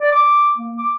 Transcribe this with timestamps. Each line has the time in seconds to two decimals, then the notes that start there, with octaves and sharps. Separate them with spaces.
0.01 D5
0.12 D6
0.58 A#3
0.78 D6